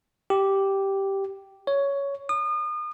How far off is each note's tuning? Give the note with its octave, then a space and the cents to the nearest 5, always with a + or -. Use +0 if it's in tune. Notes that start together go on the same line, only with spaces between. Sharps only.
G4 -5
C#5 +10
D#6 -35